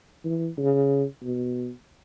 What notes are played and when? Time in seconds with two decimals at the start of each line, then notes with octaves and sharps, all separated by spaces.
0.25 E3
0.58 C#3
1.23 B2